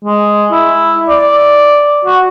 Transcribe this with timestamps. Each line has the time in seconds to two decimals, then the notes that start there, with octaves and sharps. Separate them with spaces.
0.05 G#3
0.52 E4
1.09 D5
2.05 F#4